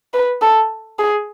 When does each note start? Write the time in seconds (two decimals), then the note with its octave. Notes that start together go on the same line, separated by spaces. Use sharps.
0.14 B4
0.42 A4
0.99 G#4